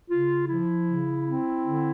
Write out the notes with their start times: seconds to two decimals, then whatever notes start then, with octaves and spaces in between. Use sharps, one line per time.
0.10 C#3 F4
0.48 F3 E4
0.86 C#3
1.25 C4
1.62 D3